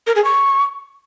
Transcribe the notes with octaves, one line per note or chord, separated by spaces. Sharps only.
A#4
G#4
C#6